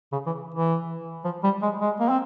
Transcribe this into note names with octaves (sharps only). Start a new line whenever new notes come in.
C#3
E3
E3
F3
G3
G#3
G#3
A#3
C4